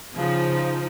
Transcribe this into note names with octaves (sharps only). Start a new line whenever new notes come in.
C#3 F3 D#4